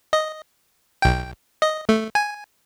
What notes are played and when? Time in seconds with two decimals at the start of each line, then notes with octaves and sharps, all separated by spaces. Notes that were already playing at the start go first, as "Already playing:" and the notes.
0.13 D#5
1.02 B1 G5
1.62 D#5
1.89 A3
2.15 G#5